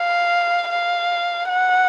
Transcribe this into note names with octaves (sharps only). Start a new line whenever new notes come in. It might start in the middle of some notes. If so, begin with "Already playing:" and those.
Already playing: F5
F5
F#5